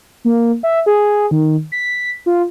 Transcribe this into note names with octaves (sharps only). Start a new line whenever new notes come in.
A#3
E5
G#4
D#3
B6
F4